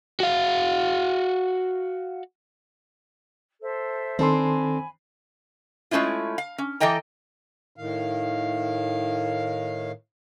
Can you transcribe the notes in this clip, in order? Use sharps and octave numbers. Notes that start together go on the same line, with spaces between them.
F#4 F5
A4 C5 E5
D#3 C4 D4 A4 G#5 B5 C6
G#3 A3 C#4 E4 F4
F5
C#4
E3 A4 D#5 G5 A#5
A2 D#3 F5